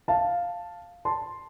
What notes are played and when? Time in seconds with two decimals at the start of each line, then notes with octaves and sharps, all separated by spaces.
0.08 F5 A5
1.05 A5 C6